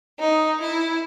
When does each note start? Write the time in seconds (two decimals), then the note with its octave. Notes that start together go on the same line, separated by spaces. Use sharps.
0.19 D#4
0.58 E4